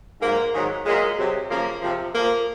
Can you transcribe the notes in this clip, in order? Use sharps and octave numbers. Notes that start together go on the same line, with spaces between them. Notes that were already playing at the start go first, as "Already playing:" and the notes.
G#2 F#3 A#3
G#2 D#3 F#3
A#2 F#3 G#3
C3 F#3
F#2 C#3 F3 A#3
C3 F3
A#2 F3 A#3